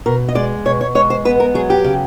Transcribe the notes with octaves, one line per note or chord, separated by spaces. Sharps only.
B2 A#4
D#5
G#3 D5
B2 C#5
C#5
G#3 C#5
C5
B3 B4
A#4
F#3 G#4
G4
C#3